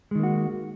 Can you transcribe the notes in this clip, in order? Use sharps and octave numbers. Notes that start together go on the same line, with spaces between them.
D#3 G#3 A#3 F#4